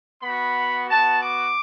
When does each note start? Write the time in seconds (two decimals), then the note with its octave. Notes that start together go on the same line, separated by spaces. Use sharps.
0.21 B3 F#4 B5
0.88 B3 F#4 A5
1.21 D6